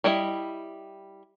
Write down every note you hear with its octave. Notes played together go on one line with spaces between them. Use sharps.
G3 E4 D#5 E5